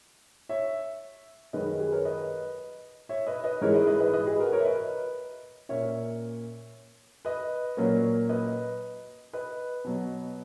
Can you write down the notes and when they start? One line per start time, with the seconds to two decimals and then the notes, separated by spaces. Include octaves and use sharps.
0.49 C#5 E5
1.53 F#2 D#3 G#3 C#4 B4 D#5
1.79 G#4 B4
1.92 A#4 C#5
2.05 B4 D#5
3.09 C#5 E5
3.27 B4 D#5
3.44 B4 D#5
3.61 G#2 E3 G#3 A#4 C#5
3.74 B4 D#5
3.87 B4 D#5
4.00 B4 D#5
4.13 B4 D#5
4.27 G#4 B4
4.39 F#4 A#4
4.52 A#4 C#5
4.60 E5
4.65 B4 D#5
5.69 A#2 A#3 C#4 C#5 E5
7.25 B4 D#5
7.77 A#2 F#3 A#3 C#4
8.29 B4 D#5
9.33 B4 D#5
9.84 B2 F#3 B3